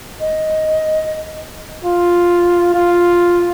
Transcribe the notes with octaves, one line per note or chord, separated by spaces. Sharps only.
D#5
F4
F4